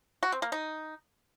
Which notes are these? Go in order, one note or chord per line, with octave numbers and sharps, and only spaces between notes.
F#4
C4
A#3
D#4